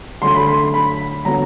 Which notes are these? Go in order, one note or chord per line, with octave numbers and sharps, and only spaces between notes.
D3 F#3 A3 C6
B5
C6
B5
D3 F#3 B3 A#5